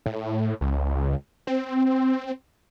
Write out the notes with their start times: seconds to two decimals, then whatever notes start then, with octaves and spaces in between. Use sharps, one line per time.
0.06 A2
0.61 C#2
1.47 C4